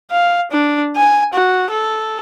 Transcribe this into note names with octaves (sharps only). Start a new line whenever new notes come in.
F5
D4
G#5
F#4
A4